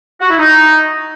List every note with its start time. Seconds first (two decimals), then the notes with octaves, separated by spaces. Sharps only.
0.20 F#4
0.29 E4
0.38 D#4